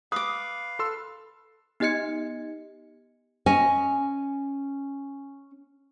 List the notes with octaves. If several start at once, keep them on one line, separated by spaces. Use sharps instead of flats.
B4 F5 D6 D#6
A4 C6 E6
B3 D#4 G4 D#5 G#6 C#7
C#4 D#5 G#5